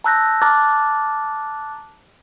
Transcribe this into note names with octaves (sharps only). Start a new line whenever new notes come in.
A5 A#5 E6 F#6 G6 A#6
A5 A#5 D6 F6 F#6 A6